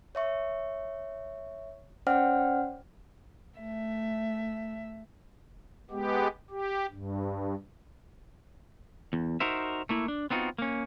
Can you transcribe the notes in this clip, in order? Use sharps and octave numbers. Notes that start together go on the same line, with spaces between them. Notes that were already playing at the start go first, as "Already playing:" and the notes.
C#5 E5 C#6
C#4 C5 D5 F#5 G5 F6
A3 E5
G#3 B3 G4
G4
G2
E2
D#4 F#4 A#4 C5 E5
A3 A#3 E4
D4
B3 C4 D#4 F4 F#4
A#3 C#4